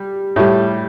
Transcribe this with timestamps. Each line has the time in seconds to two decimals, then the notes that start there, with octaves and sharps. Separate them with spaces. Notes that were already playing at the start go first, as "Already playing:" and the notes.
Already playing: G3
0.36 A2 G3